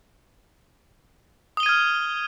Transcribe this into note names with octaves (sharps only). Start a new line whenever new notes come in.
D#6 F6 G#6 D#7 G7